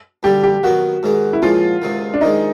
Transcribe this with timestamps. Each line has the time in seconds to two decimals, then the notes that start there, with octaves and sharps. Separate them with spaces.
0.23 G2 D3 G3 G4
0.43 G4
0.63 D#3 F#3 B3 F#4
1.03 G#2 D#3 G#3
1.33 E4
1.42 A#2 F3 G#3 F4
1.82 C#2 C3 D#3
2.14 D4
2.21 C3 D#3 G#3 D#4